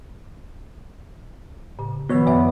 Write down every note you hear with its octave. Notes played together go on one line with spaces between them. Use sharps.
A2 C#3
B2 D#3 F3 B3 C#5
F#2 B4 D5 E5